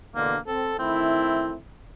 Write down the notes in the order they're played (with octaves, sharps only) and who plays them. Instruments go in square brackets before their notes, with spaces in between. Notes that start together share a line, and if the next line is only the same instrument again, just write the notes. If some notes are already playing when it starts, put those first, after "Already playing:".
[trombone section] E2 B2 D3 [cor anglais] A#3
[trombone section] C4 [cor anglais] A4
[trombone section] D#3 A3 E4 [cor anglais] C4